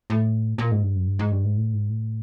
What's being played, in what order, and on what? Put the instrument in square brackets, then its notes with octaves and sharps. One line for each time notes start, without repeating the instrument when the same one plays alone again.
[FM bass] A2
A#2
G#2
G2
F#2
G2
G#2
G2
G#2
A2
G#2
A2